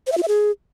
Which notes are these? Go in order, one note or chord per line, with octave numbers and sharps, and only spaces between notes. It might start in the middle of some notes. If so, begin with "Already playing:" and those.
C5
E5
F4
E5
G#4